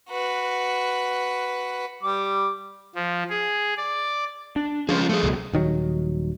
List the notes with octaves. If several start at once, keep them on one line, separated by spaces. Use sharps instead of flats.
F#4 B4
G3 D6
F3
G#4
D5
D4
F3 C#4 F4 G#4
A3 G#4
C#2 B2 F#3
D#1 D#3 F#3